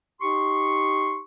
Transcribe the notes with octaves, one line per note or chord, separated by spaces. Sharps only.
D#4 G4 C6 C#6